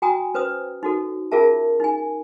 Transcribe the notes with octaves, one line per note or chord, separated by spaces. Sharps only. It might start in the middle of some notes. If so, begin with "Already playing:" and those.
F#4 G5 G#5 A#5 D#6
C#4 B4 C5 D#6
D#4 F#4 A4
C#4 F4 G#4 A#4 E5 A5
D#4 G#5